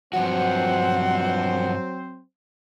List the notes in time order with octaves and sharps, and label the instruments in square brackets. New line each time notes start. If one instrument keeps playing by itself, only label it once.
[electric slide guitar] G2 F3 F#4 [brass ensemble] F#3 C4 C5 [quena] F#5